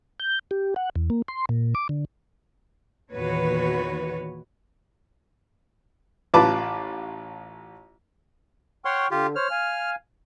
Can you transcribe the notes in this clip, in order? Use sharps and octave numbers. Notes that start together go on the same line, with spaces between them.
G6
G4
F#5
E2
A#3
C6
A#2
D6
D3
E2 A#2 D#3 F#4 B4 C#5
A1 F4 B4 A5 D6
C#5 F#5 G5 C6 C#6 F6
D3 F4 G4
C5 C#5 F6
F5 G#5